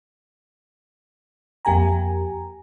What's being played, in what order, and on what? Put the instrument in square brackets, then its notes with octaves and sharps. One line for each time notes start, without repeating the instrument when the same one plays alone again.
[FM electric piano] F2 A#3 G4 G#5 A#5